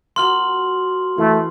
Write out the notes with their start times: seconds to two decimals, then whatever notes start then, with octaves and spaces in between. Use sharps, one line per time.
0.16 A#3 F4 F#4 C6 F6 F#7
1.18 E3 A3 F5